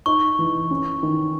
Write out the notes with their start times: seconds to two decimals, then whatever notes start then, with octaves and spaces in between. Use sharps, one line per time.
0.06 D#4 C#6
0.39 E3
0.71 C#4
1.03 D#3